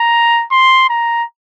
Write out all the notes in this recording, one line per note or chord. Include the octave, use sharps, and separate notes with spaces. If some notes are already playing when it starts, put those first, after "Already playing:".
Already playing: A#5
C6
A#5